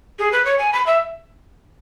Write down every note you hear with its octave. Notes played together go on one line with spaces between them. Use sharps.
G#4
B4
C#5
G#5
B5
E5